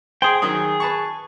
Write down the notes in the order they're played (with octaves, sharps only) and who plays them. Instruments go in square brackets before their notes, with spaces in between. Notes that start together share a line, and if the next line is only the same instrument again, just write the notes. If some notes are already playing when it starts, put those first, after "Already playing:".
[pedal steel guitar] G#4 G5 [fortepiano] C5
[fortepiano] D#3 F#3 D#6 [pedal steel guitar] G#4
[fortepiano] B4 A5 C#6